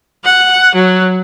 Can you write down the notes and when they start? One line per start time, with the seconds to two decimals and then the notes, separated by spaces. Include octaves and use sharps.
0.25 F#5
0.75 F#3